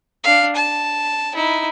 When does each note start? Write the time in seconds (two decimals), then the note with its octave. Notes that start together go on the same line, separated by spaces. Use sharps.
0.24 D4 F5
0.56 A5
1.35 D#4 E4